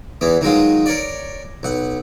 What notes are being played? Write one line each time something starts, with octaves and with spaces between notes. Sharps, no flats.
E2 E3 B3
D#3 F#3 G#3 F4
A#4 C#5 D5
B1 F#5